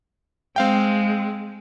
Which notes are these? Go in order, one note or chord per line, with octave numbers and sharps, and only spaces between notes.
G#3 C4 F5 G5